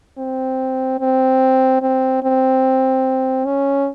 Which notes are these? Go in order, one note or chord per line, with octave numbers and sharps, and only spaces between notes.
C4
C4
C4
C4
C#4